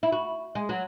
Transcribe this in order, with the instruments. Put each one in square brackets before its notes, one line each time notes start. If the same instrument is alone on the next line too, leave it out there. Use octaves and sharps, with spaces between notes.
[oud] E4
F#4
G#3
F#3